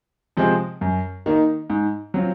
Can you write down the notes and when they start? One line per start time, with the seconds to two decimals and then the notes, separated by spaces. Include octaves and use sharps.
0.37 C3 F3 G#3 C4
0.81 F#2
1.26 D#3 A#3 D#4
1.70 G#2
2.14 F#3 C4 F4